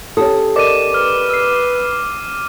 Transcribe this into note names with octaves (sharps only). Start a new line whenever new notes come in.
C#4 G4 A4 D#6
A#4 D5 D#5 D6 D#7
B4 F6
E6 C7